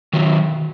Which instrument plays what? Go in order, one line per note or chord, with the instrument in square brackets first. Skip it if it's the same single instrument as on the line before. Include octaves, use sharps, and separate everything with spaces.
[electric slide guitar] D#3 F#3